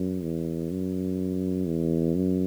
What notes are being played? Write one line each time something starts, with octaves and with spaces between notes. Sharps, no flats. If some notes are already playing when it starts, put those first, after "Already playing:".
Already playing: F#2
E2
F#2
E2
F#2